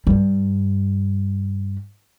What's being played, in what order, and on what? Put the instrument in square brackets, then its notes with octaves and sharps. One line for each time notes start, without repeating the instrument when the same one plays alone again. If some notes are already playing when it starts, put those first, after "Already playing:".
[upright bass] G2 G3